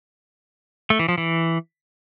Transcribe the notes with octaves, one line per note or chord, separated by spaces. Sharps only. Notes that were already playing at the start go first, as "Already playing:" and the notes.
A3
E3
F3
E3